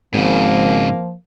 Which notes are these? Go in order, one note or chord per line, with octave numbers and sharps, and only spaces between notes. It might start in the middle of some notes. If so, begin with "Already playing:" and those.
G#1 G#2 C#3 F3 A#3